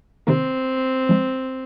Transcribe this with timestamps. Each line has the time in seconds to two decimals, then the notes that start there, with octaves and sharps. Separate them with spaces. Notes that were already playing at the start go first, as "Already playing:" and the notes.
0.27 C3 D#3 A#3 C4
1.09 F3 G#3